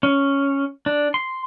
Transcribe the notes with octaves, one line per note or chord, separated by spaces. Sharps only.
C#4
D4
C6